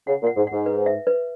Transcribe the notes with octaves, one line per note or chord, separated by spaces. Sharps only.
C#3 F#5
A#2
F#5
G#2
G#2 F#5
B4
E5
B4